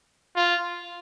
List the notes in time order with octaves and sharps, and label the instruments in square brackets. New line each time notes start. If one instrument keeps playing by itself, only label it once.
[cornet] F4